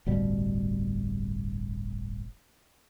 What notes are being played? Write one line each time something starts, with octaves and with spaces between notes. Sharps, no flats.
D1 G1 B2 G3